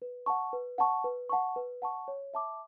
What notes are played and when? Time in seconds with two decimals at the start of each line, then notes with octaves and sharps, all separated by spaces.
0.02 B4
0.26 F#5 A5 C#6
0.53 B4
0.78 F#5 A5 C#6
1.04 B4
1.29 F#5 A5 C#6
1.56 B4
1.82 F#5 A5 C#6
2.08 C#5
2.34 E5 A5 D6